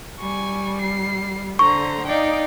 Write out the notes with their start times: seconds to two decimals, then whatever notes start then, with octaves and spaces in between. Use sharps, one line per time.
0.20 G3 G#5 C#6
0.82 C7
1.59 D3 C5 A#5 C#6
2.07 D#4 D5 F5 G5